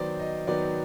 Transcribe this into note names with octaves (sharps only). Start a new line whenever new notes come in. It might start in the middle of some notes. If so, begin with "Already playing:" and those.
Already playing: D#3 F#3 B3 C5 D5
D#5
D#3 F#3 B3 D5